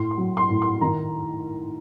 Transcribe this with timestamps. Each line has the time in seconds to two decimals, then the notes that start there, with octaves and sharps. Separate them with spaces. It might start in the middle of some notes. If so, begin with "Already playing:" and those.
Already playing: A2 C6
0.11 C6
0.18 F#3
0.37 C6
0.50 A2
0.62 C6
0.81 D#3 A#5